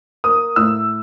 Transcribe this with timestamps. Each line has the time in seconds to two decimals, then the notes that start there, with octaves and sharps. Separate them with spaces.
0.24 A#3 D#6
0.56 A2 E6